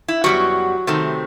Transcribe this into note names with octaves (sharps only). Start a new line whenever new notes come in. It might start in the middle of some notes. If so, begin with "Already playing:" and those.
E4
F#2 D#3 F#3 G3 B3 F#4
C3 D#3 A3 C4